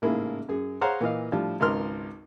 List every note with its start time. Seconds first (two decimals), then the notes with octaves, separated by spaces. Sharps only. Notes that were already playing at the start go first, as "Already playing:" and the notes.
0.02 A1 G#2 C#3 A#3 E4 G#4
0.49 F#2 G#4
0.81 G#4 C5 C#5 F5 F#5 A#5
1.01 A#2 E3 D#5 F5
1.32 A2 F3 G3 D4
1.60 G#1 C#2 A#4 C6 F6